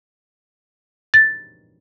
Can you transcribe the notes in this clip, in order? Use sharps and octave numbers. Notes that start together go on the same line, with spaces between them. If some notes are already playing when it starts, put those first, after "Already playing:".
A6